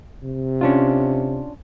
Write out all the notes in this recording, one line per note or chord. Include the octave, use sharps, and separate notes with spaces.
C3
C#4 D4 F4